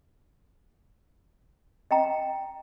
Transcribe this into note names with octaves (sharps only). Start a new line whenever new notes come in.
D#5 G5 A#5